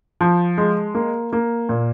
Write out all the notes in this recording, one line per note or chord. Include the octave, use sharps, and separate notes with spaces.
F3
G#3
A#3
A#3
A#2